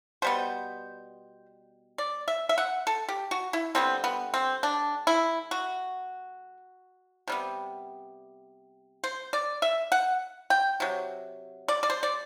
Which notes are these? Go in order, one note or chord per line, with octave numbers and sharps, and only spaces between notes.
B2 G3 B3 C5
D5
E5
E5
F#5
A4
G4
F#4
E4
D3 G3 B3 C4
B3
C4
D4
E4
F#4
C3 G3 B3
C5
D5
E5
F#5
G5
C3 F#3
D5
D5
C5
D5